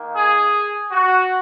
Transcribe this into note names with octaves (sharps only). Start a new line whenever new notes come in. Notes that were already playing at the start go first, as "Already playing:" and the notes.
Already playing: D#3 A#3
G#4
F#4